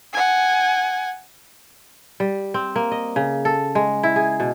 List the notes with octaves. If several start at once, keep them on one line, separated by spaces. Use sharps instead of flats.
F#5 G#5
G3
C4
A#3
D#5
C#3
A4
G#3
E4
G#4
B2